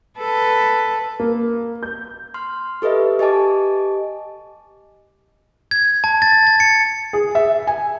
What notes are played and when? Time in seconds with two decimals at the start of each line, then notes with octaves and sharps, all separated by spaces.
0.20 A4 B4
1.20 A#3
1.83 G6
2.34 C6 F6
2.82 G4 A4 B4 D#5 E5
3.19 G4 D#5 G#5 A5 D6
5.71 G#6
6.04 A5
6.22 A6
6.47 A6
6.60 C#7
7.13 G#4
7.35 E5
7.67 G#5